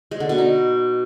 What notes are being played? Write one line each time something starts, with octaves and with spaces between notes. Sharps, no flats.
G#3
D3
B2
D#4